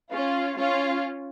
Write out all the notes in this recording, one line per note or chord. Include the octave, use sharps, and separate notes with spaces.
C#4 F4
C#4 F4